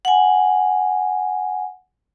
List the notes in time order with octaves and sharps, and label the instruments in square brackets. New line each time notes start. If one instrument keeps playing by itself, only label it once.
[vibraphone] F#5 G#5